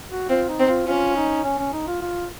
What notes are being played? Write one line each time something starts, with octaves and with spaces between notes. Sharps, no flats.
F#4
C4 F4
D#4
C4
F4
C#4 F4
D#4
C#4
C#4
D#4
F4
F4